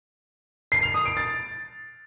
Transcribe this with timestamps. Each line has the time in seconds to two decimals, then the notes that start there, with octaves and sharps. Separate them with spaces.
0.72 C7
0.83 F7
0.94 D#6
1.05 D7
1.17 A6